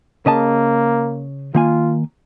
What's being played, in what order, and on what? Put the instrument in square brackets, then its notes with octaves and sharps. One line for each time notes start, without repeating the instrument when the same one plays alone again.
[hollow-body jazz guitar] C#3 D#5 A5 [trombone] A#3
[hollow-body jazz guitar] D#3 A#3 G#5 [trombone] F4